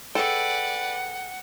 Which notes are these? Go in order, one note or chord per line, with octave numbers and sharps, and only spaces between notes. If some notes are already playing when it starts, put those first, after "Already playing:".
G#4 A4 B4 D5 F#5 G5